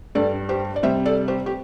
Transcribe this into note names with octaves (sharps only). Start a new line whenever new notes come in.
G2 G3 A4 D5
G4 C5
D5
C3 G3 C5 E5
A4 D5
G4 C5
G4